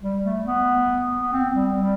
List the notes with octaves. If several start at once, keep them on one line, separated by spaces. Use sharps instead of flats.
G3
A3
B3
B3
C4
G3
G3